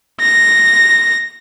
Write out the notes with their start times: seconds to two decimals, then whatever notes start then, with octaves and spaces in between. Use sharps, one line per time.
0.20 A#6